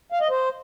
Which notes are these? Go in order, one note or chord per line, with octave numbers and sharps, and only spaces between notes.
F5
D#5
C5